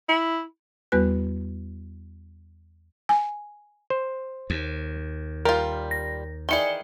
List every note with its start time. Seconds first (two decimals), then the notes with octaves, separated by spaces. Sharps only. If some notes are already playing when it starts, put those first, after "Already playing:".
0.09 E4
0.92 E2 G3 B3 F#4 B4 F#6
3.09 G#5
3.90 C5
4.50 D#2
5.45 G3 F4 A#4
5.91 A#6
6.49 D#3 E3 G#4 D5 C#7 G7